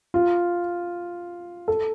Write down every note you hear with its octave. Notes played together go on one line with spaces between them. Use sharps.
F4
A4